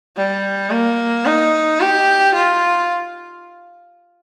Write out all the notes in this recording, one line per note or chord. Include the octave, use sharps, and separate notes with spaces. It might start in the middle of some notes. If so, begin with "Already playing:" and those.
G3
A#3
D#4
G4
F4